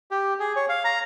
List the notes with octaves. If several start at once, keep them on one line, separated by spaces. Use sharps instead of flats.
G4
G#4
C#5
F5
A#5